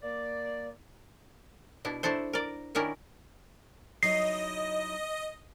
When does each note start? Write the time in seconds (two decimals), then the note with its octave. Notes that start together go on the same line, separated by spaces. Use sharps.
0.02 A#3 D5
1.85 B2 D4 E4
2.03 A3 D4 E4 A4 C5
2.33 A#4 D5
2.75 D#3 C#4 D4 E4 A#4
4.03 F#3 D#4 E4 D#5 C7